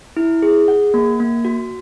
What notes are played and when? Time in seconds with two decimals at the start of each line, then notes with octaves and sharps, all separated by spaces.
0.17 E4
0.42 G#4
0.68 F#5
0.94 A#3
1.20 A#3
1.45 F#4